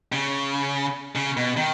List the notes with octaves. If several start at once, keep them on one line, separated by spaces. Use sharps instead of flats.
C#3
C#3
B2
D#3